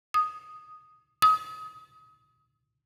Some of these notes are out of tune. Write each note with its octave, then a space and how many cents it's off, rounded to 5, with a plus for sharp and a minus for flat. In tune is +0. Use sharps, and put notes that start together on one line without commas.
D#6 -5
D#6 +30